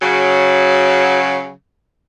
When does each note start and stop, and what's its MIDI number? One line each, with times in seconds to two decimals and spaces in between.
0.01 1.51 49
0.01 1.51 54